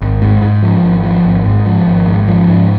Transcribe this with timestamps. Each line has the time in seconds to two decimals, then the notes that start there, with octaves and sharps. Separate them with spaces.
0.02 G#1
0.22 G#2
0.42 G#2
0.63 F3
0.84 G#1
1.04 F3
1.25 G#1
1.45 G#2
1.66 F3
1.87 G#1
2.08 G#2
2.28 F3
2.48 G#2